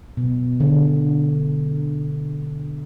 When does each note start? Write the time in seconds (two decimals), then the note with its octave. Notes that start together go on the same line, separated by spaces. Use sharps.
0.17 B2
0.60 D3